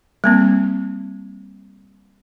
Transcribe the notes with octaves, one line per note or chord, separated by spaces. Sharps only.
G3 A#3 C4